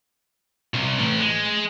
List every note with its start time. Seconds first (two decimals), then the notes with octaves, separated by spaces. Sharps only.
0.74 C2
0.99 A2 E3
1.20 G#3